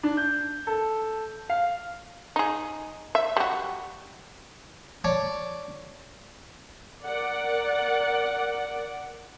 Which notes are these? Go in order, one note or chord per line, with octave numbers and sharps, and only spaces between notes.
D4
G6
A4
F5
D#4 G#4
E5
G3 F#4
C#5 D5 A5
A#4 D5 F#5